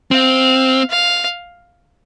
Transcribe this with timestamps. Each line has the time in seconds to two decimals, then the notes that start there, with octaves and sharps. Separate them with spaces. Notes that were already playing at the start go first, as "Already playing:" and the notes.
0.11 C4 F5
0.90 F5